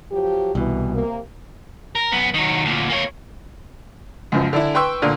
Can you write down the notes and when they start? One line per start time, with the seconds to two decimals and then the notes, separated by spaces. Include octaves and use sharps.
0.11 F3 F#3 G4
0.55 C2 B2 E3
0.94 C3 A#3
1.95 A#4
2.12 F#2 B3
2.34 D#3 F#3
2.65 D2 A#2
2.90 A#3 C#5
4.32 C#2 F#2 F3
4.53 D3 D4 E4
4.75 B4 G5 C6 C#6 E6
5.02 A#2 D3